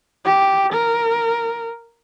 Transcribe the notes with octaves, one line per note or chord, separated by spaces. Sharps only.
G4
A#4